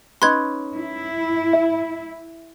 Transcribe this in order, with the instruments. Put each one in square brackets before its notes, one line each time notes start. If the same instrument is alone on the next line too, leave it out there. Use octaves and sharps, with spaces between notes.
[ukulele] C#4 D#4 B4 [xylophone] C6 F#6 G#6
[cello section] E4
[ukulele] E5